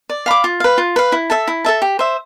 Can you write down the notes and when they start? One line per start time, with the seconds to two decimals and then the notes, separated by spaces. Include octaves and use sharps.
0.10 D5
0.26 F5 B5 D6
0.44 F4
0.60 B4 F5
0.78 F4
0.96 B4 F5
1.12 E4
1.30 A4 E5 A5
1.48 E4
1.65 A4 E5 A5
1.82 G4
1.99 C5 E5